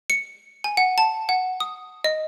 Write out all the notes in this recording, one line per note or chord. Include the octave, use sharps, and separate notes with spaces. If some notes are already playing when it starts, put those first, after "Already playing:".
C#7
G#5
F#5
A5
F#5
D#6
D#5